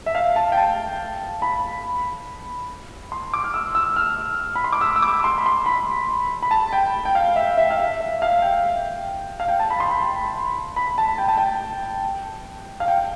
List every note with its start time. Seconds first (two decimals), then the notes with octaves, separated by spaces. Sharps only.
0.06 E5
0.15 F5
0.36 A5
0.52 G5
0.57 A5
1.42 B5
3.12 C6
3.34 D6
3.44 F6
3.54 E6
3.75 E6
3.96 F6
4.55 B5
4.64 C6
4.73 D6
4.81 E6
4.96 E6
5.02 D6
5.24 C6
5.38 B5
5.46 C6
5.66 B5
6.42 B5
6.51 A5
6.73 G5
7.05 G5
7.15 F5
7.36 E5
7.58 E5
7.71 F5
7.79 E5
8.01 E5
8.22 F5
8.42 G5
9.40 F5
9.48 G5
9.60 A5
9.70 B5
9.80 C6
9.91 B5
10.76 B5
10.98 A5
11.18 G5
11.28 A5
11.37 G5
12.80 F5
12.88 G5